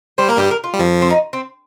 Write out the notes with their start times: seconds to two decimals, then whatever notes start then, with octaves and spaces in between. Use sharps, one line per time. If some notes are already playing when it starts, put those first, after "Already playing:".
0.18 G3 C5
0.28 A#3 A#4
0.37 G2 G3 G4
0.51 A#4
0.64 F4
0.74 G3
0.80 F2 F3
1.02 C4
1.10 D#4
1.33 C4